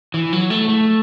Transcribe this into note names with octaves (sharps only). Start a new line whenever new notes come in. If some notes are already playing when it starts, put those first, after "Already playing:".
E3
F#3
A3
A3